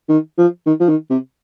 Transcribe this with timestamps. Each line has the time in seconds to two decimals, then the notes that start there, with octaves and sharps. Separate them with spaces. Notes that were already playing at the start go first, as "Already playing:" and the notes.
0.09 D#3
0.38 F3
0.66 D#3
0.80 F3
0.89 D#3
1.10 C3